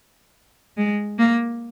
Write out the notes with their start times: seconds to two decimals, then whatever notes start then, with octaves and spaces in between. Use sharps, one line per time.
0.77 G#3
1.18 A#3